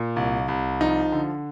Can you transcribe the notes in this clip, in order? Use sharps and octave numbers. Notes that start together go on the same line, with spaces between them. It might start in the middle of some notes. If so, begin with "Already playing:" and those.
Already playing: A#2
C2
C2
F3 D#4
D3